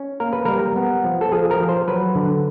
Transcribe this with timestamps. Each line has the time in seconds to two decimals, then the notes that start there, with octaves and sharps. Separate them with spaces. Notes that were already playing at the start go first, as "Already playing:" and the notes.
Already playing: C#4
0.20 A#3 A#4
0.33 B4
0.45 G3 A#4
0.76 B3
1.04 F3
1.21 A4
1.32 F3 G#4
1.51 A#4
1.60 F3
1.69 C5
1.88 F#3 B4
2.15 D3